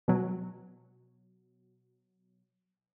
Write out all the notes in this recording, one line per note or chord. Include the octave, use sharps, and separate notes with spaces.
B2 F#3